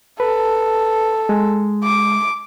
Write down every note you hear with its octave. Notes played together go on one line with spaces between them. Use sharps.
A4 B4
G#3
D6